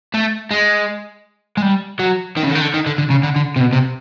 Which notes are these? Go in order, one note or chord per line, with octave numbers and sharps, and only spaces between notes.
A3
G#3
G#3
G3
F#3
D#3
C#3
D3
D#3
D3
D#3
D3
D3
C#3
D3
D3
C3
B2
C3